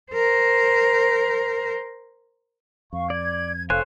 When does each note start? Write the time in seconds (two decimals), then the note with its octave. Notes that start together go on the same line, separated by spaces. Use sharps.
0.12 A#4 C5
2.93 F2 F5 C#6
3.10 D5 G#6
3.70 F1 A4 C5 C#5 F5 G#5 F#6